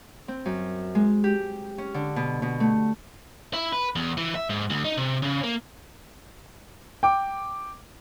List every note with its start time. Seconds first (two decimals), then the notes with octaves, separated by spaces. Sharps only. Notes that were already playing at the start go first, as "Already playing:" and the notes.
0.28 C4
0.46 F#2
0.95 G#3
1.24 G4
1.78 C#4
1.94 D3
2.16 B2
2.42 B2
2.60 A3
3.54 E4
3.72 B4
3.96 E2
4.17 E3
4.35 E5
4.50 G#2
4.70 D2
4.85 D#4
4.97 C3
5.22 C#3
5.44 A#3
7.03 G5 D6